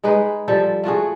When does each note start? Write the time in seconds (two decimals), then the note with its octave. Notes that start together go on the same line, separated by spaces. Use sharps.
0.04 G#3 D#4 G#4 B4
0.48 F3 G3 A4 C5
0.84 A3 F4 F#4 G#4